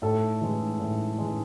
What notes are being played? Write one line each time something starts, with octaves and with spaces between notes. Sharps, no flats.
A2 A4
E3 G#3
A2
E3 G#3